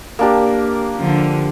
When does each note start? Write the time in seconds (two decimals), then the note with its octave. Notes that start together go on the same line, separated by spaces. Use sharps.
0.19 A#3 D4 G4
0.97 D3 F3